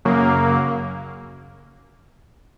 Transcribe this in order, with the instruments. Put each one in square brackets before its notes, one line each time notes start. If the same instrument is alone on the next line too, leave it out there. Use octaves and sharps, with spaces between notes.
[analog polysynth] F#2 C#3 F#3 A#3